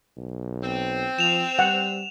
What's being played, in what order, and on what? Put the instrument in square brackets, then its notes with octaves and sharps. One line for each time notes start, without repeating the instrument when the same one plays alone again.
[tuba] B1
[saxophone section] C4
[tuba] F3 [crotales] E7 F7
[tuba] G3 [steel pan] F#5